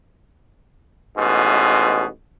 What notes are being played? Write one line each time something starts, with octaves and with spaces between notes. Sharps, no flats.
A1 G#2 B2